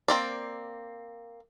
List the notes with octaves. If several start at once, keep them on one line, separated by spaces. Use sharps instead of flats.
A#3 C4 D5